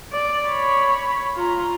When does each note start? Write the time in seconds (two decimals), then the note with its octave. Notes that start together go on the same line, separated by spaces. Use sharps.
0.13 D5
0.47 C#5 B5
1.35 F4 A#5